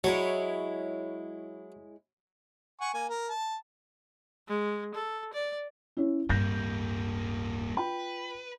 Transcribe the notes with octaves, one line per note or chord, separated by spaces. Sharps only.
F#3 G#3 E4 C#5
F#5 G#5 C#6
A#3 G#5
A#4
A5
G#3
A4
D5
C#4 E4
D1 G2 G3 A#3 G6 A#6
F4 B4 G5 B5